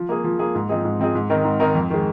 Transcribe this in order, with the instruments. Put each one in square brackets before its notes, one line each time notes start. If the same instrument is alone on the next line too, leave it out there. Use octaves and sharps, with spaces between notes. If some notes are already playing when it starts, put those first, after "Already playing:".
Already playing: [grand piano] F3
A#3 G#4
F3
A#3 G#4
G#2
F3 C4 D#4 G#4
G#2
F3 C4 D#4 G#4
G#2
D#3 C4 D#4 A#4
G#2
D#3 C4 D#4 A#4
F2
D#3 G#3